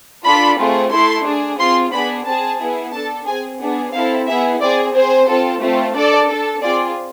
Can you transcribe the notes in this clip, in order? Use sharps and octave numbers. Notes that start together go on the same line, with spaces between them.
D4 F4 A4 B5
A3 C4 F4 G#4
A3 E4 A4 C6
D4 G#4
C4 F4 G#4 C6
B3 D4 G#4 B5
C4 G#4 A5
B3 E4 G#4
D4 A4 A5
C4 G#4 G#5
B3 D4 G#4
C4 E4 A4 F5
B3 E4 G#4 E5
C4 G#4 D5
C4 G#4 C5
C4 F4 A4
A3 C4 F4
D4 A4 D5
D4 A4
C4 F4 G#4 D5